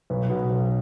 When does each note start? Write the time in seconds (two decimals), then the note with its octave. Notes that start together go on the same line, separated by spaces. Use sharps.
0.10 B1 B4
0.30 B2
0.50 B1